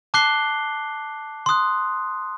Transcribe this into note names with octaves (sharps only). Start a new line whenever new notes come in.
A5 D6 F#6 C7 G7
C6 D#6 F#6